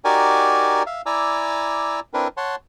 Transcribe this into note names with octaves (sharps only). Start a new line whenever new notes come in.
D#4 F#4 G4 A#4 D5 G#5
E5 F5
E4 D5 G#5 A#5 D6 E6
C4 D4 E4 A#4 B4
C#5 F#5 A5 C6